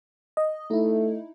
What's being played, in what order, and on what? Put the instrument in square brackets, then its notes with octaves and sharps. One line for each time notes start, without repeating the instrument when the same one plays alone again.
[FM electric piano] D#5
[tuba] A3 [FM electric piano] D#4 E4